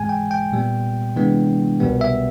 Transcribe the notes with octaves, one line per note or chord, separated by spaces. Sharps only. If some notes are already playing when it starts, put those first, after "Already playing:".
Already playing: G#2 E3 G#3 G#5
G5
G5
A#2 G3 B3
C3 E3 G#3 B3 D4
C2 B2 G3 B3
E5